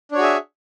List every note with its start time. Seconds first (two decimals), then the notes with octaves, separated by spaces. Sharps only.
0.12 D4
0.15 C#5
0.18 F#4
0.20 G#4
0.23 E5